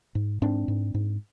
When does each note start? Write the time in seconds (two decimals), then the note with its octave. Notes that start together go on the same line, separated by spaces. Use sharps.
0.15 G#2
0.42 G#2 C4 D4
0.68 G#2
0.94 G#2